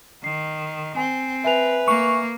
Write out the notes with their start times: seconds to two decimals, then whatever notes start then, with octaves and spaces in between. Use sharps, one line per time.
0.24 D#3 C7
0.96 C4 G#5
1.44 B4 E5 G#5 F7
1.88 A#3 C#6